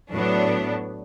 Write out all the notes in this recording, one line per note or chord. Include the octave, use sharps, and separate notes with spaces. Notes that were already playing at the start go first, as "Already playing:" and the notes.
A2 F#3 B3 D4